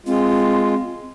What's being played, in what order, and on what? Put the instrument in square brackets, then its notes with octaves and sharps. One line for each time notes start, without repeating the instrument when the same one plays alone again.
[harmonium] G#3 F4 [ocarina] C4